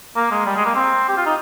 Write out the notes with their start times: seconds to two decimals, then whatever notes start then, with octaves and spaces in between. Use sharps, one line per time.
0.16 A#3
0.31 G#3
0.46 G3
0.56 G#3
0.65 A#3
0.75 C4
1.08 G4
1.17 F4
1.26 D#4